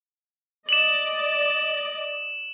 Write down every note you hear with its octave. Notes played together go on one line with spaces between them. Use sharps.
D5 D#5 E7 F#7